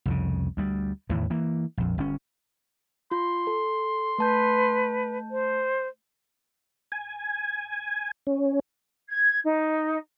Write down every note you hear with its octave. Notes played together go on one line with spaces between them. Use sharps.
C2 F2 C#3
D2 G3
E2 A2 D#3 E3
E3 A#3
A#1 F2
G1 C#4
F4 C6
A4
A3 B4 A5 G6
C5
G#5
C#4
G#6
D#4